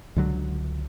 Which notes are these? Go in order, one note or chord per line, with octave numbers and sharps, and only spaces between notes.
C#2 D3 F#3